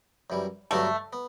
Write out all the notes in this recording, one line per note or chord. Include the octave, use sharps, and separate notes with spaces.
F#2 E3 G3
G2 D3 F#3 A3 B3 F#4
B3